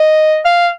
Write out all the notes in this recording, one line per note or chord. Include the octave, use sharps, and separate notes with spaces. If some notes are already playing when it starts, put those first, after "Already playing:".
Already playing: D#5
F5